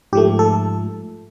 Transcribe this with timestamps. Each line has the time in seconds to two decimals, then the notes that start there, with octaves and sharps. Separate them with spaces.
0.13 G#2 F3 A3 G4
0.39 A4